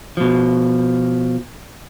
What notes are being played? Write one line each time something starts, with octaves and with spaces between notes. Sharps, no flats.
B2 F3